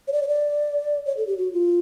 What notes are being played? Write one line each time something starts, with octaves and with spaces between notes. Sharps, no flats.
C#5
D5
C#5
D5
C#5
A4
G4
F#4
F4